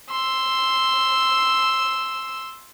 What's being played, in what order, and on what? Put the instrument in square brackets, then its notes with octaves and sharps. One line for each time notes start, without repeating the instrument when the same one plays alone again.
[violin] C6 E6